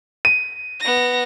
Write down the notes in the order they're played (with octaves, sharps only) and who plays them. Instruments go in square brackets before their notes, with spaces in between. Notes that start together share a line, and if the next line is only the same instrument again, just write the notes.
[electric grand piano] D#7
[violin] B3 A#6